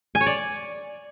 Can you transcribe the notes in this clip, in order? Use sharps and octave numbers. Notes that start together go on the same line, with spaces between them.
G#5
C#5
D5